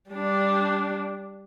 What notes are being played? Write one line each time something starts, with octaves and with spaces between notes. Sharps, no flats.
G3 D4